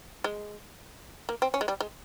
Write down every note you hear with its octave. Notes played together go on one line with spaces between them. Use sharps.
G#3
A#3
C4
C#4
G#3
G3
G#3